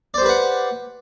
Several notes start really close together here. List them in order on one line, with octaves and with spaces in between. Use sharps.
D5 C5 G4 B4 F#5